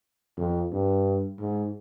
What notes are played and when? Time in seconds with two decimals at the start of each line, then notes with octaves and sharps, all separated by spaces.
0.38 F2
0.72 G2
1.40 G#2